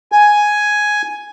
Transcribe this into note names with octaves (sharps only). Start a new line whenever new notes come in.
G#5